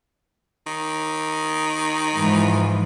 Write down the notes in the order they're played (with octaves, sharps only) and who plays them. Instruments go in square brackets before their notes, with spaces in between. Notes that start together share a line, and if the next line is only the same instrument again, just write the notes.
[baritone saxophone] D#3
[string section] G#2 E3 F3